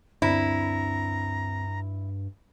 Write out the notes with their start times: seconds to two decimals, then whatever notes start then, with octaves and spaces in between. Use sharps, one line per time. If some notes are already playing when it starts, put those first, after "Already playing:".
0.22 D2 G2 C4 D4 E4 A#5